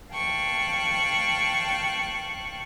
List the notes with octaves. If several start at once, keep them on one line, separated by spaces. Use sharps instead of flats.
F5 G5 A5 C#6 F#6